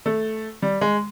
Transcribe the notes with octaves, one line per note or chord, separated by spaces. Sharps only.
A3
G3
G#3